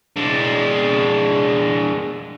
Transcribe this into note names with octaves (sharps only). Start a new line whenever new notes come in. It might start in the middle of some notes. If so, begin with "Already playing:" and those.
G#3 D4